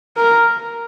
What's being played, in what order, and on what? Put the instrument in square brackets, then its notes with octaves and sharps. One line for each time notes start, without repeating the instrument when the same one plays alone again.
[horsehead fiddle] A#4